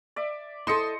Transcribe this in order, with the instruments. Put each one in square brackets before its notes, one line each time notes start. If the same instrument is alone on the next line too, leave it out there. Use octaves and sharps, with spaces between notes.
[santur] D5 E5
[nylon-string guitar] E4 A4 [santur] C5 D#5 [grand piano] C6 D#6 C#7